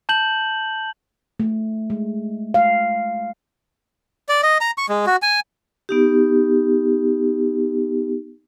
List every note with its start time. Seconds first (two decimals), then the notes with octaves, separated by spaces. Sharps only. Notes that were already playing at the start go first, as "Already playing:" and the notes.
0.09 A5 G6 F#7
1.40 A3
1.90 G#3
2.54 F5
4.29 D5
4.43 D#5
4.61 A#5
4.78 C#6
4.89 G#3
5.06 F#4
5.22 G#5
5.89 B3 D#4 G4